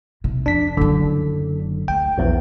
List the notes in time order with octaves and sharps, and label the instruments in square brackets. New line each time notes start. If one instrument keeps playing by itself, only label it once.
[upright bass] C2 C3
[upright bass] F2 [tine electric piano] D4 B6
[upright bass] F#1 F#3 [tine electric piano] D3
[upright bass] D2 [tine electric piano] G5
[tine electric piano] A#1 E2 E3